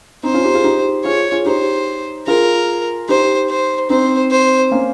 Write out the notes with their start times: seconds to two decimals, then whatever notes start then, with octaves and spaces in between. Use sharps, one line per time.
0.23 C4 D#4 C5
0.34 C#4 F4
0.44 D#4 G4
0.54 F4 G#4
0.64 D#4 G4
1.05 F4 G#4 C#5
1.32 F4 G#4
1.45 D#4 G4 C5
2.27 F4 G#4 A#4
3.09 D#4 G4 C5
3.50 C5
3.90 C4 D#4 C5
4.31 C5
4.71 A#3 C#4